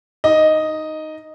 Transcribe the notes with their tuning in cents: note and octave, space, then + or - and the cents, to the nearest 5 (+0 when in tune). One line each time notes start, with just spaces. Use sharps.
D#4 +0 D#5 +0